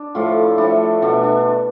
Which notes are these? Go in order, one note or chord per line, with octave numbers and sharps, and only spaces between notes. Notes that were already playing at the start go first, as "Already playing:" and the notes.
Already playing: D4
A2 F3 A3 F4
E4
A2 F3 A3 D4
B2 A3 D4
D4